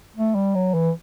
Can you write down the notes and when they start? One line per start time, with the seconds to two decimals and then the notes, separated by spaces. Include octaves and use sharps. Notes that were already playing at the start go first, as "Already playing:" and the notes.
0.16 A3
0.35 G3
0.55 F#3
0.74 E3